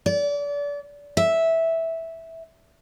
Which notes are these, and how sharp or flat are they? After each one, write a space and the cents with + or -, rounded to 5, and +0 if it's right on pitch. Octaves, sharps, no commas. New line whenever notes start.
D5 -30
E5 -10